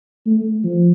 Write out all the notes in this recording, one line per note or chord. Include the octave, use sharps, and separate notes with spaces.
A3
F3